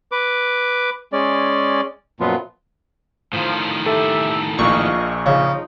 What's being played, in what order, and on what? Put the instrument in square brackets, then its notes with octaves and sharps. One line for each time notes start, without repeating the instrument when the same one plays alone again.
[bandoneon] B4 D6
G#3 C#4 D5
F#2 A#2 F3 B3 F4
[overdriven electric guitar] A2 D#3 [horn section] F3
[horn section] G4 E5 [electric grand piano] A4
[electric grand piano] A#1 A#2 [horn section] D#5 F5 [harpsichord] C#6
[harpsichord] C#3 [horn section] F3 D#4